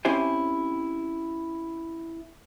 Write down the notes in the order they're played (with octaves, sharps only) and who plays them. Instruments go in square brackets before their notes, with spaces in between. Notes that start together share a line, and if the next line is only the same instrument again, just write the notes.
[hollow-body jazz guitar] C4 C#4 E4 G4 C5 G#5